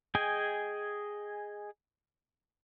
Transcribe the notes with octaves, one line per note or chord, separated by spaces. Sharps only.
G#4 D#5 G5 G#5